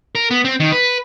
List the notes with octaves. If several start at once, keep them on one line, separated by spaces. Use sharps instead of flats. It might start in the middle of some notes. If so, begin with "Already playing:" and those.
A#4
B3
C4
D#3
B4